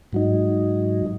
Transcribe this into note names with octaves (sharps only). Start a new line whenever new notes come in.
G#2 F#3 D#4